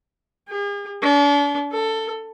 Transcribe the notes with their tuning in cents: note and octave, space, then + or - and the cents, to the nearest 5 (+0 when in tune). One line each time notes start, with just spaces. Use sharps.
G#4 -45
D4 -40
A4 +15